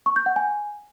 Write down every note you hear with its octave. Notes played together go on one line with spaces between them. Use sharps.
C#6
G6
F#5
G#5